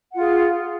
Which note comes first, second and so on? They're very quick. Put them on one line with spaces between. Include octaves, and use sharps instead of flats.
F#5 F4 G#4